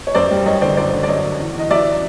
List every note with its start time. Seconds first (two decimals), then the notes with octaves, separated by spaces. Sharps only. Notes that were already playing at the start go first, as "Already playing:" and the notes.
0.07 C#5
0.15 F#2 C5 D5
0.31 G3
0.46 F#2 C#5 D#5
0.61 D3 C5 D5
0.77 F#2 C5 D5
0.93 D3
1.03 D5
1.08 F#2 C#5 D#5
1.24 F#2
1.39 E2
1.54 E2 D#5
1.70 F#3 D5 E5